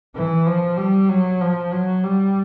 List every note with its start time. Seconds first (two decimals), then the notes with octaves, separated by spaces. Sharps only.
0.15 E3
0.46 F3
0.77 G3
1.09 F#3
1.41 F3
1.72 F#3
2.04 G3